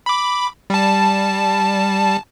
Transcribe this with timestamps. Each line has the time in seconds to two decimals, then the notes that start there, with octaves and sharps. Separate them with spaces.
0.06 B5 D6
0.70 G3 A5